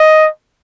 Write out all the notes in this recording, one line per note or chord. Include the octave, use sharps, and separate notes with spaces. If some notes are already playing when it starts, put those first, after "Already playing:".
Already playing: D#5